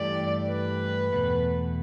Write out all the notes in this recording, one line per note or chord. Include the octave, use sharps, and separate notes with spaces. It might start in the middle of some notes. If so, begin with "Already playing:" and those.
Already playing: G2 E3 A3 G4 D5
B4
E2 B2 A3